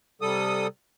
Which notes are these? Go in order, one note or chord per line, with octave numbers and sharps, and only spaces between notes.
C3 G3 A4 D#6